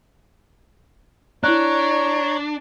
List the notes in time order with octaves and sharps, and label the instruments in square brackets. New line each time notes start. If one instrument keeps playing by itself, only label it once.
[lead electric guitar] D4 [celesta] E4 F#6 [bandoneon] C#5 A#5